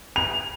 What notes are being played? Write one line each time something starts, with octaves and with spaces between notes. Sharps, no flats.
F7